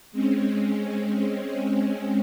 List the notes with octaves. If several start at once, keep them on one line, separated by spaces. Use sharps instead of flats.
G#3 C4 C#4